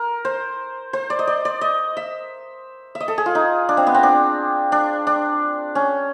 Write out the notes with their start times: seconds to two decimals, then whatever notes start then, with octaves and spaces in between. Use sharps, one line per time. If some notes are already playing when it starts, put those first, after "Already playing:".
Already playing: A#4
0.25 C5
0.93 C5
1.10 D5
1.19 D#5
1.27 D5
1.45 D5
1.61 D#5
1.97 E5
2.95 E5
3.00 D#5
3.08 A4
3.18 G#4
3.26 F4
3.35 D#4
3.69 D4
3.77 C4
3.87 B3
3.94 C4
4.03 D4
4.72 D4
5.07 D4
5.75 C#4